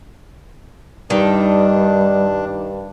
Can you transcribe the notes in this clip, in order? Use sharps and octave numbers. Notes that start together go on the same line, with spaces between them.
G2 D#3 G3 D4